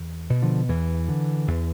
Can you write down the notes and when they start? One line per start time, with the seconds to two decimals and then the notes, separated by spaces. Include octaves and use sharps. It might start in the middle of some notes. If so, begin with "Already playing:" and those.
Already playing: E2
0.30 B2
0.42 D3 F3
0.68 E2 E3
1.08 D3
1.48 E2